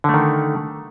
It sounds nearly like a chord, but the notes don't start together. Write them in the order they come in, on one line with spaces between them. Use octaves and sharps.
D3 A3 D#3